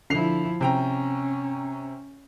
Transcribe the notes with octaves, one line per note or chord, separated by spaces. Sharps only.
D3 F3 E4 C7 F7
C3 C#4 G5 A#5